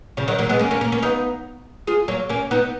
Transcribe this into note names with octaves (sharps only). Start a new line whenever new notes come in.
C#3 F3
D#3 F#3
F#3 A#3
G#3 B3
A#3 C#4
A#3 C#4
A#3 C#4
A#3 C#4
B3 D#4
F4 G#4
F#3 A#3
A#3 C#4
B3 D#4